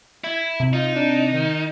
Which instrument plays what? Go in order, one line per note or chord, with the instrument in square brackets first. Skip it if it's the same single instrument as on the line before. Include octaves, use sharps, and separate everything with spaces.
[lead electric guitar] E4 [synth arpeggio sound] G#6
[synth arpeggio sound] C3
[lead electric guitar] D#4 [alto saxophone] F4
[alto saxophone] D4
D#3